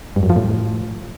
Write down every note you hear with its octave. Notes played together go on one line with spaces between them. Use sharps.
G2
F#2
F3
A2